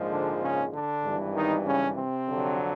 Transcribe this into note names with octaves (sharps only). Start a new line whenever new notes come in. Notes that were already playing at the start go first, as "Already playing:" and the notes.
Already playing: A#1 G#2 F3 G#3
D3 D4
C#3 C#4
D3 D4
G#1 G2 E3 G3
D#3 D#4
C#3 C#4
C3 C4
F2 D3 F#3